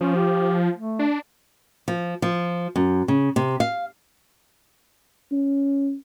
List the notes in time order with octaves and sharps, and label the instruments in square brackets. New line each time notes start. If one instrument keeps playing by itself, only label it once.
[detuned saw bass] F3 [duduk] C#4
[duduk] G4
A3
[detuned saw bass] D4
[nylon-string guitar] F3
F3
F#2
C#3
C3
F5
[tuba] C#4